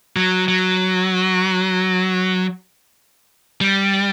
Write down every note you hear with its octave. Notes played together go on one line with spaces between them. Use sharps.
F#3
F#3
G3